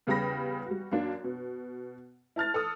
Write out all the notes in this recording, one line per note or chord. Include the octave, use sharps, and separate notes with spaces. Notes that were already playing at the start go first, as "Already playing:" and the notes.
E2 C#3 G3 G5 B5 A#6
G3 F#4
F#2 A#3 D4
B2
E4 A5 F6 A6
A4 D#6